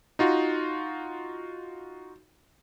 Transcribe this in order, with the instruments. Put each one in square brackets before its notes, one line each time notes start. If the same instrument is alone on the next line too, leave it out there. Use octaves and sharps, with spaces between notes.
[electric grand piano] D#4 F4 F#4